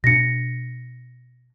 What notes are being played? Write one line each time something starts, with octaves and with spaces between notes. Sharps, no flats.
B2 D4 A#6 C#7